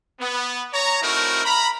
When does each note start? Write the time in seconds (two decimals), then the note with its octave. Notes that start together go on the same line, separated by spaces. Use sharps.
0.20 B3
0.73 C#5 A#5
1.02 A3 C4 D#4 E4 F#4 A#4
1.45 A#5 B5